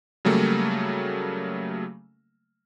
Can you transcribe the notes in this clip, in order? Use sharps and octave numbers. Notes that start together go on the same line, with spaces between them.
C#3 F#3 G3 A3 A#3